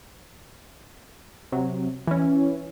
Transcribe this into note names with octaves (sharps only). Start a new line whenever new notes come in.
C3 F#3
E3 C#4